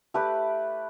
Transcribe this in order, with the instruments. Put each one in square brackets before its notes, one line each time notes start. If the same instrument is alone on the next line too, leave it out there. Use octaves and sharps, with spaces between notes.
[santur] A3 G4 B4 D5